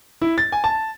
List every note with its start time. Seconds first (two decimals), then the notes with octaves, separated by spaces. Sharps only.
0.22 E4
0.38 A6
0.52 G#5
0.64 A5